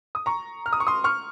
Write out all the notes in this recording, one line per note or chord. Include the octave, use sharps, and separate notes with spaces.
D#6
A#5 C#6
F6
D#6
C#6
C6 D#6
C#6 F6